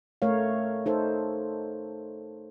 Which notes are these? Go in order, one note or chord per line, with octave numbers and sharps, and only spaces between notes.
A3 A#4 C#5 F5
D#4 A4 C5